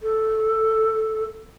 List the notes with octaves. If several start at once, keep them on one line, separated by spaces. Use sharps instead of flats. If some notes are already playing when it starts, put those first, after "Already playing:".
A4